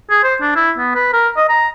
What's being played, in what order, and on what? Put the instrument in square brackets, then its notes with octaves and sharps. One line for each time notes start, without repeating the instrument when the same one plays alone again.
[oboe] G#4
C5
D4
E4
B3
B4
A#4
D#5
A#5